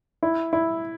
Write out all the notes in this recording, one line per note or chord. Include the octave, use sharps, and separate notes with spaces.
E4
E4